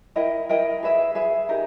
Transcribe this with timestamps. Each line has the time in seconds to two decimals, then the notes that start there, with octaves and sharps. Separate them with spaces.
0.16 E4 A#4 D#5 G5
0.49 E4 A#4 D#5 G5
0.83 G#4 B4 E5
1.15 G#4 B4 E5
1.49 D#4 G4 A#4